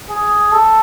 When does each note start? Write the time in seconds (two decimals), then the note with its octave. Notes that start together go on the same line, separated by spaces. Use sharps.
0.10 G#4
0.52 A4